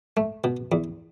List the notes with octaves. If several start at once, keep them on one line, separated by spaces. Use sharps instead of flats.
A3
B2
E2